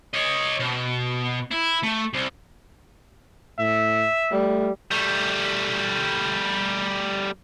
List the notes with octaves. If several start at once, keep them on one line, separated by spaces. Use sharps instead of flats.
C#5 D#5
B2
E4
A3
C2
A2 E5
G3 A3
G3 A3